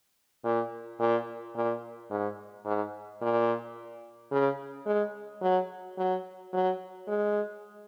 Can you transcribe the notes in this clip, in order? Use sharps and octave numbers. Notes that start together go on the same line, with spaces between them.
A#2
A#2
A#2
G#2
G#2
A#2
C#3
G#3
F#3
F#3
F#3
G#3